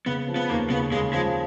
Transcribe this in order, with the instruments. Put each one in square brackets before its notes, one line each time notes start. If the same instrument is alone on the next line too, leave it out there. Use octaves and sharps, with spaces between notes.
[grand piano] C#3 [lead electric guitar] B3
[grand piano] F3
[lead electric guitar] B3
[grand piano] D#2 [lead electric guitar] A#3
[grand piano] C#3 [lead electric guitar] B3
[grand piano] C#3 [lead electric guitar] G#3
[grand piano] F3 [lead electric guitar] G#3